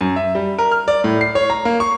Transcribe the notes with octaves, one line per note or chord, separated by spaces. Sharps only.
F#2
E5
G3
A#4
F6
D5
A2
C7
C#5
A#5
A#3
C#6